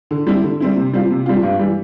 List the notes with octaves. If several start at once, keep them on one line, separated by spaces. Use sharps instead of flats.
D3
G3 C4 E4
D3
G3 C4 E4
C3
G3 C4 F4
C3
G3 C4 F4
G2
E3 G3